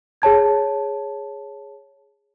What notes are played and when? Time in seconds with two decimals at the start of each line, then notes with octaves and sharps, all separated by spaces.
0.22 G#4 C#5 A5 G#6